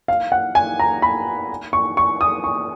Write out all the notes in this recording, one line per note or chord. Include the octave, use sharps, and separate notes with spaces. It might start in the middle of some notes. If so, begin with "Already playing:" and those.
F5
F#5
G#5
A#5
B5
C#6
C#6
D#6
C#6